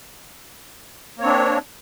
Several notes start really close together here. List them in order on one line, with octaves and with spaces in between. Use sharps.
A#3 C#5 C4 D4